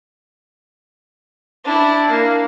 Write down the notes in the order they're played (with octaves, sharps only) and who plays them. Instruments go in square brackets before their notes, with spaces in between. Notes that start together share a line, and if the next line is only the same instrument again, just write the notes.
[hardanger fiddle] D4 E4
A#3